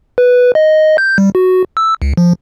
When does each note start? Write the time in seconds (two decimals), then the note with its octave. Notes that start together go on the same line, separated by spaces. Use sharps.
0.18 B4
0.55 D#5
0.98 G6
1.18 G3
1.35 F#4
1.77 E6
2.02 C#2
2.17 F3